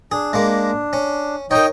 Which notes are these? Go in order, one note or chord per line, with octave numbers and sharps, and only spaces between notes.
D4 G#4
G#3 A#3
C#4
D#4 A#4 C#5 D#5 G5